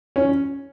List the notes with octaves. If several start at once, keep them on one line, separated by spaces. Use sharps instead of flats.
C#4